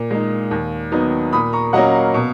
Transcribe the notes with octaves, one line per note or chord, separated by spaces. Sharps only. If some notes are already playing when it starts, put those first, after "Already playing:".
Already playing: A#2
G#3 D#4
D#2
D#3 F#3 B3 D#4
A#2 B5 D#6
A#5 C#6
F#3 A#3 C#4 D#5 F#5
F5
B2